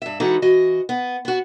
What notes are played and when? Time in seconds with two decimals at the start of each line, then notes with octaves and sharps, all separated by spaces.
0.02 G2 E5
0.20 E3 G#3 D#4 E4 F#4 A4
0.42 E3 F#4 D#5
0.89 B3
1.25 B3 F#4